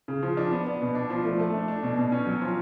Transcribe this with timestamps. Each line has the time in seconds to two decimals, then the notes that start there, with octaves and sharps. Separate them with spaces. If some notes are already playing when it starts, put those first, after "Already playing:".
0.08 C#3
0.22 F3
0.37 D4
0.51 B3
0.67 B3
0.81 B2
0.95 D4
1.10 F3
1.25 A3
1.39 A3
1.54 D4
1.68 D4
1.83 B2
1.97 B2
2.12 C#4
2.27 F#3
2.41 F3